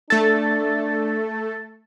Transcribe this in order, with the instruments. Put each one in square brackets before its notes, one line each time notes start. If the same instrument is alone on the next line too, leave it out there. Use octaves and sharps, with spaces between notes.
[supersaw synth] A3 A4 [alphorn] D4 [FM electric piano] A6